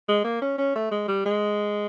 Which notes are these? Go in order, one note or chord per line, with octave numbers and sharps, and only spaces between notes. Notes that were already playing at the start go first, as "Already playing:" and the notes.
G#3
A#3
C#4
C#4
A3
G#3
G3
G#3